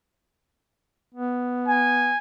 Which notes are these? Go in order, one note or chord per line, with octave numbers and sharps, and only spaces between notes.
B3
G#5